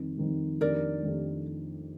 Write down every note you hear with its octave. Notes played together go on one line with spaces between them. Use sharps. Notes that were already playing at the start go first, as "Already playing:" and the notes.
Already playing: F2 D#3 G3 C4
F2 D#3 G3 C4
F2 D#3 A3 D4 G4 A#4 D5
F2 D#3 A3 D4 G4